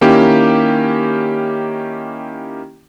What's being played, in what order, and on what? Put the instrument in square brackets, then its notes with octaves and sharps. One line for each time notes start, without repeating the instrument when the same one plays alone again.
[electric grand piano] D#3 A#3 C#4 E4 G4